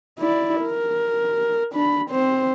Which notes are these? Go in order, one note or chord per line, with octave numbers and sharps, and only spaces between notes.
E4 D5
A#4
D4 B5
C4 C5